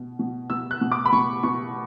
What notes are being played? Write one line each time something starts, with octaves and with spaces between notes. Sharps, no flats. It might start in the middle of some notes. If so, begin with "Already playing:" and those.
Already playing: B2
B2
B2 E6
F#6
B2
D6
B5
B2 C#6
B2 C#6